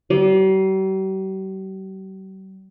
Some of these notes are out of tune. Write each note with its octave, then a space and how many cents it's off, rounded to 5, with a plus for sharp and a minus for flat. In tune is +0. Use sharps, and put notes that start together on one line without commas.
G3 -45